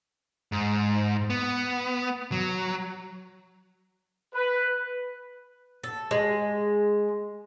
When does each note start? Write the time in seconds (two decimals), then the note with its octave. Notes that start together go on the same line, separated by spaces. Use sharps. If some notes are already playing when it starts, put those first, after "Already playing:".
0.52 G#2
1.30 B3
2.32 F#3
4.35 B4
5.84 A4
6.11 G#3